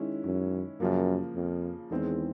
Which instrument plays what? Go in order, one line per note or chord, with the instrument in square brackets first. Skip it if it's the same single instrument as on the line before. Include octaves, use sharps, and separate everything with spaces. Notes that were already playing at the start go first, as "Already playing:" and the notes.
Already playing: [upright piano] D#3 G#3 C#4 E4
[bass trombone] F#2
[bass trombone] F#2 [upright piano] C#3 F3 A#3
[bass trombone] F2
[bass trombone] E2 [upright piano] D#3 G#3 C4 E4